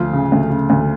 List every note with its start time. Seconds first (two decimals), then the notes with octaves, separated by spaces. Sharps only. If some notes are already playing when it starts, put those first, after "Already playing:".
Already playing: D2 F3 F4
0.13 C#3
0.32 D2
0.50 C#3
0.70 D2